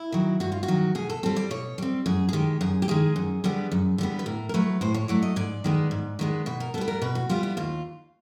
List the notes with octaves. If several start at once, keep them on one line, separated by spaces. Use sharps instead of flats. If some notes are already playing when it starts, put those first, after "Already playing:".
Already playing: E4
D#3 F#3
G2 F#4
F4
F#4
D#3 F#3
B2 G#4
A4
G3 C4 A4
D5
B2 C#5
G3 C4
F#2 G#4
G#4
D#3 G#3 G4
F#2 G#4
G4
D#3 G#3 G#4
F#2
D3 G3 B3
F#2
D3 G3 B3
B4
A2 A#4
A#4
F#3 A3 B4
A2 C5
C#5
F#3 A3 D5
D#5
G#2 D5
D#3 G#3 B3
G#2
D#3 G#3 B3
B2 B4
A#4
G3 B3 A4 B4
A#4
B2 B4
F#4
G3 B3 F4
E4
D#2 F4